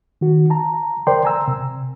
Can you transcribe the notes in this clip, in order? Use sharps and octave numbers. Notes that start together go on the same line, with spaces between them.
D#3 F#4
A5 A#5
A#4 C5 D5 G5 C6
G#5 A#5 E6
C3